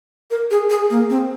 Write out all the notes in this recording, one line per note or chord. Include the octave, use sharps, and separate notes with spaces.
A#4
G#4
G#4
A#3
C4